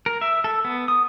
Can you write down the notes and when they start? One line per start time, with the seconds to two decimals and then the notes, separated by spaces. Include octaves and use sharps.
0.06 A#4
0.21 E5
0.44 A4
0.65 B3
0.88 D#6